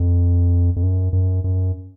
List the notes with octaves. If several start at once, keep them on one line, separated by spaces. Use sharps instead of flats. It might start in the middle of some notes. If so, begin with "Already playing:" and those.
Already playing: F2
F2
F#2
F#2
F#2